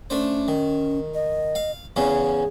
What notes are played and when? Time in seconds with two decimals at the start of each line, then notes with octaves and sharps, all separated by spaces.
0.10 A3 C#4 D4 C5
0.48 D#3
1.14 D#5
1.55 F5
1.96 E2 C#3 C#4 G#4